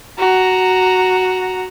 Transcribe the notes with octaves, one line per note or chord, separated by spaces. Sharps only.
F#4 A#5